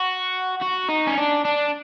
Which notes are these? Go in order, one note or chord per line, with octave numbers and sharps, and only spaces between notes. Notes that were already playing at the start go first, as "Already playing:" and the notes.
Already playing: F#4
F#4
D#4
C#4
D4
D4